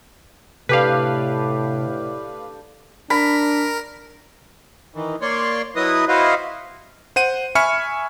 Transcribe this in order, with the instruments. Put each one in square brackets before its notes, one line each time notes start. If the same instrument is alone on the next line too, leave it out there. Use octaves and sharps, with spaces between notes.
[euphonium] A2 [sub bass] C3 [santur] D4 G4 A4 [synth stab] B4 F5
[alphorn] D4 [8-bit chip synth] A#4 [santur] B5
[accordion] D#3 E3
A#3 C#5 D5 C6
F#3 E4 B4 D#5 D#6
E4 F#4 B4 C5 D#5 F5
[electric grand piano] C5 F#5 D#7
E5 G#5 B5 C#6 F6 C#7